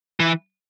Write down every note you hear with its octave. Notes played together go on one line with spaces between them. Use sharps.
E3